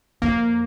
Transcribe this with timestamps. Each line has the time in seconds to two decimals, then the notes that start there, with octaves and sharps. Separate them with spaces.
0.22 F2 A#3